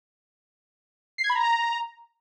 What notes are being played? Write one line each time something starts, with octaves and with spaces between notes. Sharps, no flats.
C7
G#6
B5
A#5